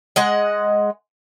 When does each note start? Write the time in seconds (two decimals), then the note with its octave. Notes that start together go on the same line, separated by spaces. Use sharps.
0.16 G#3 D#5 F#5